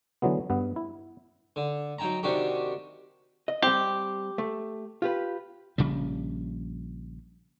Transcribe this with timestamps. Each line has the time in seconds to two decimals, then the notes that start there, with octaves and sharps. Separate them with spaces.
0.22 D3 E3 F#3 G#3 B3
0.50 G2 B3
0.76 E4
1.56 D3
1.99 F#3 D#4 G5 A5 A#5
2.23 C3 D#3 D4 F#4 G4
3.48 D#5
3.62 G3 C4 G4
4.38 A3
5.02 F4 G4 B4
5.78 A#1 C#3 F3 G3